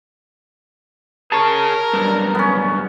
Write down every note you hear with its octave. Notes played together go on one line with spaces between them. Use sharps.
G#4 A#4 C#5 A5 C#6
B1 G2
B3 C#4